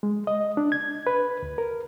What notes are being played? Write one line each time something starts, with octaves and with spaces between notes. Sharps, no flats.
G#3
D#5
D4
G#6
B4
D2
A#4